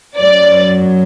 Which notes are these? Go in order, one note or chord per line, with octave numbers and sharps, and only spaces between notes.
F#2 F#3 D5